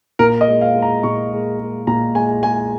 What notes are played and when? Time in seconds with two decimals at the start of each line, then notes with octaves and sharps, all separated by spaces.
0.19 A#2 A#4
0.41 D#5
0.48 G#3
0.61 F5
0.76 G#3
0.82 A#5
1.03 A#2 C#6
1.32 G#3
1.60 G#3
1.87 A#2 A#5
2.15 G#3 G#5
2.43 G#3 G#5